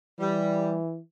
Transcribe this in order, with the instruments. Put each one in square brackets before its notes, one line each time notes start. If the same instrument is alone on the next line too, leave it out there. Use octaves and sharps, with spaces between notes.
[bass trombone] E3 [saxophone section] G3